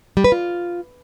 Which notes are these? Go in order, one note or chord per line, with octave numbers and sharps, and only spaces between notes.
G3
B4
F4